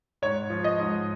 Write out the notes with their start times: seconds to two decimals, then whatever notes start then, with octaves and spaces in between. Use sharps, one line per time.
0.22 G#2 C#5
0.50 F3
0.64 D#5
0.79 G#2